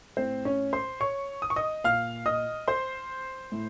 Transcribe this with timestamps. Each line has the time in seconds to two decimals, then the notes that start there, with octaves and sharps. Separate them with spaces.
0.17 A2 C4 C5
0.45 C#4 C#5
0.73 C5 C6
1.00 C#5 C#6
1.42 D#6
1.50 C#6
1.56 D#5 D#6
1.84 A#2 F5 F6
2.26 D#5 D#6
2.68 C5 C6
3.52 A2